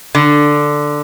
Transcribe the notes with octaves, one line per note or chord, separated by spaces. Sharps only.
D3